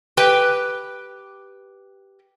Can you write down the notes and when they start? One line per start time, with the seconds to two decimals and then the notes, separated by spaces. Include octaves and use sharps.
0.17 G4 B4 G5